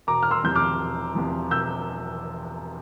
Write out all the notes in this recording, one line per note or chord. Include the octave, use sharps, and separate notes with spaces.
E1 A#5 D6
F6
C6 E6
E2 C3 F3 G6
D6 F6
E1
E2 C3 F3
E1 E6 G6